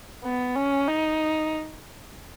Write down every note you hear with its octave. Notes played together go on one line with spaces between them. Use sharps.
B3
C#4
D#4